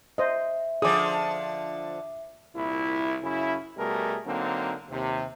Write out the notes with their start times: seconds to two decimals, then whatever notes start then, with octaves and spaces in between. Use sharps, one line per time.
0.18 C5 D#5 E5
0.82 D3 F3 G#4 D6 D#6
2.55 C2 A#2 E4
3.22 F#2 C#3 C#4 E4
3.77 B2 G3 A3 G#4 A#4
4.26 D3 F#3 A#3 C4 D#4
4.90 D#2 C3